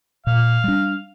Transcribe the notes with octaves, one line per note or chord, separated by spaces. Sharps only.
A#2 F5
G3 D4